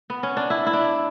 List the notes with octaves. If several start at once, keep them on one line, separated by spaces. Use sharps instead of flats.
B3
C#4
D4
E4
E4
D4